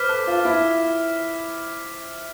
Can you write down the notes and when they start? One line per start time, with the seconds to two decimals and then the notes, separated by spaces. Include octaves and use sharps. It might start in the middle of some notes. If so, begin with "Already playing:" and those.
Already playing: B4 C5 D6 F6 B6
0.09 A4
0.27 F4
0.45 E4